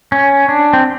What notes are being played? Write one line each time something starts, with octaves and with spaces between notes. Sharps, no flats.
C#4
D4
C4